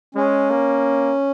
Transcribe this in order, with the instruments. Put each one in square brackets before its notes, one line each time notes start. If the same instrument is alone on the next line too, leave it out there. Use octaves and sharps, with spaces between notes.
[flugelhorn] G#3 [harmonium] C#4
[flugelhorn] A#3